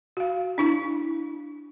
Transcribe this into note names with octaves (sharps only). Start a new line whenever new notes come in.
F#4 F5
D4 E4